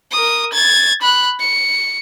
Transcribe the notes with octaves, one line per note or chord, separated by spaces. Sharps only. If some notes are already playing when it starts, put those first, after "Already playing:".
A#4 D#6
G#6 A6
B5 F#6
C#7